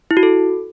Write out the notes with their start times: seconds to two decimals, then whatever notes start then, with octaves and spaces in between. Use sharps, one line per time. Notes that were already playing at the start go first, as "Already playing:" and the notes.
0.11 E4
0.17 F#4
0.23 A4